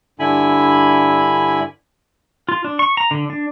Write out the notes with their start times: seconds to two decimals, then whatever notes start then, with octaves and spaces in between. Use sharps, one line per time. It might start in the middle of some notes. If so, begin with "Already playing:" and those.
0.19 G2 D3 E4 G#5 B5
2.49 F4
2.64 D4
2.79 C#6
2.97 A#5
3.11 D3
3.30 D4